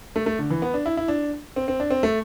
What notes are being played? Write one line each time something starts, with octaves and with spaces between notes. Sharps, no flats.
A3
A3
D3
E3
B3
D4
E4
E4
D4
C4
C4
D4
C4
A3